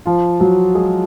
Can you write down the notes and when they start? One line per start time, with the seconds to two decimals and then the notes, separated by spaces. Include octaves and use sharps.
0.06 F3 F4
0.40 F#3 F#4
0.75 G#3 G#4